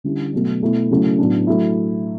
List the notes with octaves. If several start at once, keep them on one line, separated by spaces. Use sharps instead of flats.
D3 G3 C#4 E4
B2 F#3 A3
B2 A3 E4
C#3 F#3 A3 C#4 E4
A2 F#3 B3 D4
F#3 A3 E4